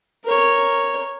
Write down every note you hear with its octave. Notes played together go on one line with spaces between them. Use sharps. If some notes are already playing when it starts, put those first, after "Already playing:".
A#4 C#5